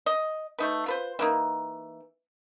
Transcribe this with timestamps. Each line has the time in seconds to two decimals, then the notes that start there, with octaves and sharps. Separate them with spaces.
0.06 D#5
0.59 A3 D#4 B4
0.86 F4 B4 C5
1.19 E3 A#3 D#4